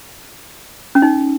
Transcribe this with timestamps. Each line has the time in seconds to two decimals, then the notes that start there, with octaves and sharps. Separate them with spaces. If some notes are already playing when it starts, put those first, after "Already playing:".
0.95 C#4
1.02 D#4